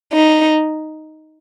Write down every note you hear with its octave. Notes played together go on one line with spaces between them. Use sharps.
D#4